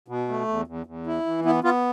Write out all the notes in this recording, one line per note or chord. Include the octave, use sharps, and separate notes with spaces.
B2
A3
E2
E2
E2
E4
E3
B3 E4
B3 F4